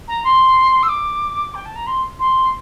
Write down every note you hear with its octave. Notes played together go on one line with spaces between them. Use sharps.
A#5
C6
E6
D6
G5
A5
A#5
C6
C6